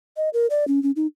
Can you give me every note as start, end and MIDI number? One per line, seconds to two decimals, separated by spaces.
0.17 0.29 75
0.33 0.47 70
0.50 0.67 74
0.68 0.82 61
0.83 0.91 61
0.96 1.07 63